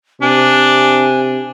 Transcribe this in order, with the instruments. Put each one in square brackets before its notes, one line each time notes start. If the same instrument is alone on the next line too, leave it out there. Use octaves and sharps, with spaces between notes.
[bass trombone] C3 [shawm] D4 [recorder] G#5